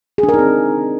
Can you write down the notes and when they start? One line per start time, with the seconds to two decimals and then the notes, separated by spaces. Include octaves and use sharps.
0.18 G#4
0.23 D4
0.29 A#4
0.34 D#4
0.39 C4